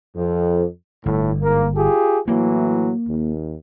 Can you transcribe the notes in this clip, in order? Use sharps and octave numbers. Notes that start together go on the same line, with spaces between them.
F2
G1 A2
G#2 A#3
F4 G4 G#4
A2 E3 F#3 A#3
D#2